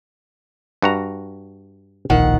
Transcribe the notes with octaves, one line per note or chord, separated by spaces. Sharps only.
G2 F#4 A#5
D1 A#1 D#3 F#5